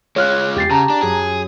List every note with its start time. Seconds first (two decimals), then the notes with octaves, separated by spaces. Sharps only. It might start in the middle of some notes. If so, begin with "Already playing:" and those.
0.16 G#3 F4 C#5 F6 F#6
0.56 E2 G4 G#4 A6 C7
0.71 C#3 A5 A#5
0.90 D4
1.02 F#2 G#4